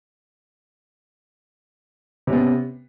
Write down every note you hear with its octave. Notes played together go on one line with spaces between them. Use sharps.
C3 B3 C#4